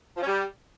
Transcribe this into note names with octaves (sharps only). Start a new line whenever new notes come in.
F3
C#4
G3